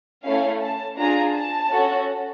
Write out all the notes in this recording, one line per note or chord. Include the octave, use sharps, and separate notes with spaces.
A3 C#4 E4 F5
A5
D4 F4 G#4 A#5
A5
C#4 F#4 A4